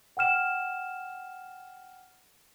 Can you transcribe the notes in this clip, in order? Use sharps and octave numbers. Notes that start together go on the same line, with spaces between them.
F#5 G5 F6 E7